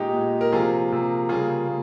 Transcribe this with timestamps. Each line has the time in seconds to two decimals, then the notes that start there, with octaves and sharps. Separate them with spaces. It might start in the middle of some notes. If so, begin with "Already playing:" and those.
Already playing: A#2 G#3 D#4 G4
0.14 A#2 G#3
0.41 A#4
0.52 C3 F3 A#3 F4 G#4
0.91 C3 F3 A#3
1.29 C#3 G3 A#3 F4 G#4
1.68 A#3